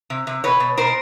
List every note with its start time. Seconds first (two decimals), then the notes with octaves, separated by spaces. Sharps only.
0.10 C3
0.27 C3
0.44 B2 B4 C#5
0.60 B2
0.77 B2 A#4 C5